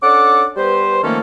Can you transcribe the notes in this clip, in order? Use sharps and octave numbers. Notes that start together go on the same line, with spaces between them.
C#4 D4 A4 F#5 D6
G3 B3 B4 C5
D#3 F3 A3 A#3 C#4 A4